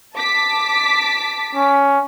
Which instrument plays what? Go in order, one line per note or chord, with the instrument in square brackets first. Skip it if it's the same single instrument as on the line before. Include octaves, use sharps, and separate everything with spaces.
[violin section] A5 D6 B6
[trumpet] C#4